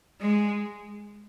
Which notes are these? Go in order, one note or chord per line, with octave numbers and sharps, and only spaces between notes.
G#3